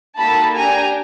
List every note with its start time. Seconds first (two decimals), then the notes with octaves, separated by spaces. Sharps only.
0.17 A#3 D#4 F#4 A4 A5 B5
0.57 D4 G4 G#5 A#5